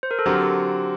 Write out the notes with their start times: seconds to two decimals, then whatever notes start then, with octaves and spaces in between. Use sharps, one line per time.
0.03 C5
0.11 A#4
0.19 A4
0.26 D3 F#3 C4 F#4 G4 A#4
0.40 G4